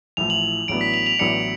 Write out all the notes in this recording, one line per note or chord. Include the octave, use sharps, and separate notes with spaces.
A1 A2 F3 F7
F#7
A1 A2 F#3 B3 D4 D7
B6
F7
F7
A1 A2 F#3 B3 D4 C#7